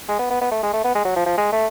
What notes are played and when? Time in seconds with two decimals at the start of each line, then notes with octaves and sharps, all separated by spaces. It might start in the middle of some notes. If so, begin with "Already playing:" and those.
0.09 G#3
0.19 B3
0.30 B3
0.41 B3
0.51 A3
0.63 G#3
0.73 A3
0.84 B3
0.95 G#3
1.04 F#3
1.16 F3
1.26 F3
1.38 G#3
1.52 A3